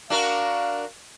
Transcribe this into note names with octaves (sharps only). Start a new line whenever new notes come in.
D4 F#4 A#4 F5